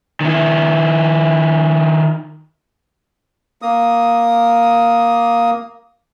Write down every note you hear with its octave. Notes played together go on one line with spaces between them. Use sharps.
D#3 E4
A#3 D#6